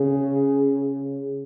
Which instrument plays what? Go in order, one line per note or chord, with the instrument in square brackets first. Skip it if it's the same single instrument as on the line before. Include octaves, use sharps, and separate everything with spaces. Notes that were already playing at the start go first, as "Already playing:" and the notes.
Already playing: [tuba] C#3